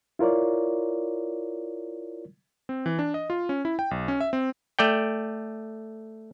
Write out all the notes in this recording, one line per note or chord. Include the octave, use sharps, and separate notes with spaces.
E4 F4 A#4 C#5 D5
C4
E3
D4
D#5
F4
C#4
E4
G5
B1
C#4
E5
C4
A3 D5 G5